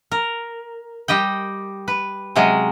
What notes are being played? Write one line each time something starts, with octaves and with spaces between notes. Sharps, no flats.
A#4
G3 G4 D#5 G5
B4
C3 F#3 G#3 C#4 D#5